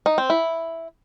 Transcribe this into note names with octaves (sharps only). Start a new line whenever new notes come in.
D#4
C4
E4